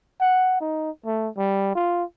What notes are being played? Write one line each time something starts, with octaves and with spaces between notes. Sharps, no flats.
F#5
D#4
A3
G3
F4